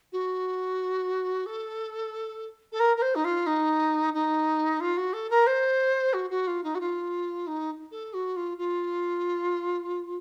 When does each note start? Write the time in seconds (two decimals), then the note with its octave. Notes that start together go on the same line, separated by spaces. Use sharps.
0.12 F#4
1.46 A4
2.72 A4
2.79 A#4
2.97 A#4
3.02 C5
3.15 D#4
3.24 F4
3.46 D#4
4.14 D#4
4.80 F4
4.97 F#4
5.13 A4
5.30 A#4
5.46 C5
6.13 F#4
6.30 F#4
6.47 F4
6.63 D#4
6.75 F#4
6.80 F4
7.47 D#4
7.91 A4
8.13 F#4
8.36 F4
8.58 F4